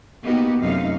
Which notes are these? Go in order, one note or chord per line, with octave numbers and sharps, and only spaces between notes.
A#3 B3 D#4 F#4 G4
F#2 C3 A3 D#4 F5